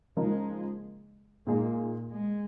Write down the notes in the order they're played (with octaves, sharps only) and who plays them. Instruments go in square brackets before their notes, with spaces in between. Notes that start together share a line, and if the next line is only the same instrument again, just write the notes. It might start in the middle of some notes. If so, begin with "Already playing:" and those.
[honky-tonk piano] C#3 F3 A#3 D#4 A#4 [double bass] G#3
[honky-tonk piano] A#2 G#3 D#4 G#4 [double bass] A#3
[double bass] G#3